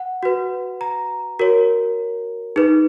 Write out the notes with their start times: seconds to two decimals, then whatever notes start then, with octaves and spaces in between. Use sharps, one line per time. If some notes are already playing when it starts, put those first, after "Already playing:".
Already playing: F#5
0.23 F#4 B4
0.81 A#5
1.39 F#4 A#4 C#5
2.56 D#4 G#4 B4